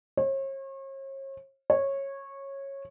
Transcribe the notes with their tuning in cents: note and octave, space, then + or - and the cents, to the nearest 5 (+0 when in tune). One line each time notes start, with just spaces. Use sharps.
C#5 -40
C#5 -15